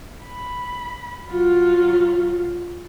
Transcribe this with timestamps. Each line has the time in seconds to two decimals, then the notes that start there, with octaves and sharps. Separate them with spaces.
0.24 B5
1.28 F#3 F4